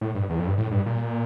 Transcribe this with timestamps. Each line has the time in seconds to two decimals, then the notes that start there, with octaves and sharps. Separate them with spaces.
0.01 A2
0.15 G2
0.30 E2
0.39 F2
0.47 G2
0.58 A2
0.71 G2
0.86 A#2